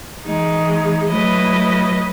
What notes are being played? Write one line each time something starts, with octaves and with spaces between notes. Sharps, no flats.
E3 G#3 D#4
F#3 A3 E4 B4 D#5